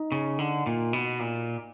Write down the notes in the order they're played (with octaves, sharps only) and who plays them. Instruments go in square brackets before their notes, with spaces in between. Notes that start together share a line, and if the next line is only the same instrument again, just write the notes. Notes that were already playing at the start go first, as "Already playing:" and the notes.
Already playing: [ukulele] D#4
[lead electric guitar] C#3
D3
A#2
B2
A#2